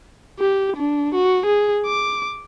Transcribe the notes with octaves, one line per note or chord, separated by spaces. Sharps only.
G4
D4
F#4
G#4
D6